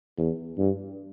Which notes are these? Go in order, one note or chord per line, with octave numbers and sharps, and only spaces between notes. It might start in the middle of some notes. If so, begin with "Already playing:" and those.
E2
G2